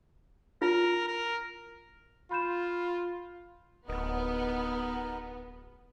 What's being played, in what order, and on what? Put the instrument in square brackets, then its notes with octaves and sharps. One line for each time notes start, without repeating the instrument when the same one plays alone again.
[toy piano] E4 F4 [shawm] A#4
[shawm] A#4
[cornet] F4 [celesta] B5 G6 E7
[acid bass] D1 [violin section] B3 [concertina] D#4 A#4 D#5